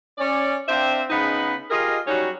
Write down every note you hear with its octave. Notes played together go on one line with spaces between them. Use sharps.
C#4 D5
C4 D4 C5 E5 F5 G5
C#3 G#3 B3 D#4 B5
F4 G4 G#4 A#4 D#5
F#3 G3 C#4 D#4 F#4 G4